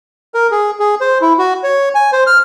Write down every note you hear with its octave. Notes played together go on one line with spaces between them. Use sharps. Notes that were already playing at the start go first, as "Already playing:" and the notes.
A#4
G#4
G#4
C5
E4
F#4
C#5
G#5
C5
F6